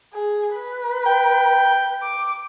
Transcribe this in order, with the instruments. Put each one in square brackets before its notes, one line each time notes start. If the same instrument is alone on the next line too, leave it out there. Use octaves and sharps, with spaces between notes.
[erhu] G#4
B4
[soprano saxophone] G5
[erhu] D6